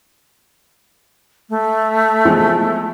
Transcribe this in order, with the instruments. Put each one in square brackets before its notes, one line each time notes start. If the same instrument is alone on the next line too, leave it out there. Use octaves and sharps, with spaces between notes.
[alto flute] A3
[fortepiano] E2 F3 G#3